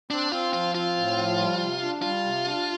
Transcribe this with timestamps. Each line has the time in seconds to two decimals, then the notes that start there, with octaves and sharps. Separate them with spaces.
0.10 C4 D4
0.32 C4 F4
0.53 F3 F4
0.74 C4 F4
0.97 A2
1.17 F3
1.39 G3
1.60 C3
1.82 D4
2.02 G3 F4
2.24 C3
2.46 D4